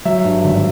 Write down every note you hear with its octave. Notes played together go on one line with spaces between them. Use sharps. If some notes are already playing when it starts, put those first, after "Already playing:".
F#3 E5
G2
G#1